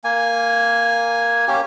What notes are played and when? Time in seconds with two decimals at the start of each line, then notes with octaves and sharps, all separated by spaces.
0.04 A#3 G#5
1.48 A#3 C#4 G4